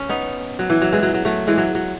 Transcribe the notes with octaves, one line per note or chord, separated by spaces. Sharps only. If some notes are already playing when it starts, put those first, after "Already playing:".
Already playing: C#4
B3 D#4
F#3
E3
F#3
E3 G#3
F#3
F#3
F#3 A3
E3 G#3
F#3
F#3